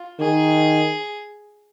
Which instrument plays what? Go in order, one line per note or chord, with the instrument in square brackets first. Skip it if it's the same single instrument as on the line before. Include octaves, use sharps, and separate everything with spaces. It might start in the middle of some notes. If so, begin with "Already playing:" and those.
Already playing: [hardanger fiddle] F4
[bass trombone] D#3 [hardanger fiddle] G#4